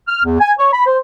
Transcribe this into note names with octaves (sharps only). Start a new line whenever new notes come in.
F6
E2
G#5
C#5
B5
C5